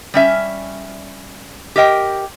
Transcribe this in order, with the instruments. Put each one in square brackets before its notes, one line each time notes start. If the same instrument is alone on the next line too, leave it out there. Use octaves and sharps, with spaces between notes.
[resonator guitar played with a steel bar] G3 C#4 E5 G#5
G4 A#4 D#5 G5